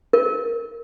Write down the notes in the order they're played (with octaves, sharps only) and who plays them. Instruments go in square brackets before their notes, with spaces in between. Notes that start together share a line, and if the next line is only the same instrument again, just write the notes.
[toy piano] A#4